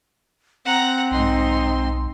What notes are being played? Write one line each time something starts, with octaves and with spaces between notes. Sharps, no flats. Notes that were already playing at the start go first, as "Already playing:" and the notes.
C4 F#5 A#5
B1 G#2 D#4 C6